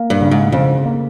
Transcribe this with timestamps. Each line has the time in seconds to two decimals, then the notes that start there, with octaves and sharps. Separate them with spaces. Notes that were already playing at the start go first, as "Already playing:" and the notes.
Already playing: A#3
0.10 G2
0.21 C#3
0.31 G#2
0.52 F2 C#3
0.86 A#3